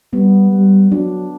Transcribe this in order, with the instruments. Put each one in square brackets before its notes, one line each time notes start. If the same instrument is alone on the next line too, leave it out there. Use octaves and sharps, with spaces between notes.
[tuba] G3 [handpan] B3
[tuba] G3
[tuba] F#3 [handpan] D4